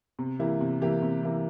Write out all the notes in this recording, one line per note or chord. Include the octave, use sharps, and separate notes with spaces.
C3
E3 A#3 E4 G4
C3
E3 A#3 E4 G4
C3
E3 A#3 E4 G4